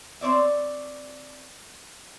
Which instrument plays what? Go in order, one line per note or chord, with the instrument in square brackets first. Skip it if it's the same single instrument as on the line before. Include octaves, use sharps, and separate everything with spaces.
[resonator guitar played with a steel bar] C4 C#5 D5 E5